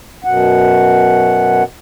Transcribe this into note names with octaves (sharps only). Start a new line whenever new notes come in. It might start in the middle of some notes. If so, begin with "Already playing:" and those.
F#2 B2 F#5